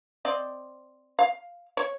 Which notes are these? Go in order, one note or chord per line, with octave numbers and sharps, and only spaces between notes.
C4 D5 D#5
F5
C#5